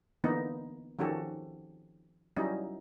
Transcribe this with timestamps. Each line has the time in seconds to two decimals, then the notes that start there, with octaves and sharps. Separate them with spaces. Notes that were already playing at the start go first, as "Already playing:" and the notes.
0.24 D3 E3 A#3 B3 D#4
0.99 D#3 F3 C#4 F#4 G4 A4
2.36 F#3 G3 C#4 D#4 E4